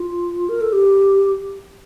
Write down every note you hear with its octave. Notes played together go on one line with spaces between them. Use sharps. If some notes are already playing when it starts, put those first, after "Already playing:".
Already playing: F4
A#4
A4
G4